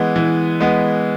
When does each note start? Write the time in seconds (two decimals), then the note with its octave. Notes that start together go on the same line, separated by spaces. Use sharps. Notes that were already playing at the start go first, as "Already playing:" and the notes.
Already playing: E3 G#3 B3
0.16 E3
0.61 G#3 B3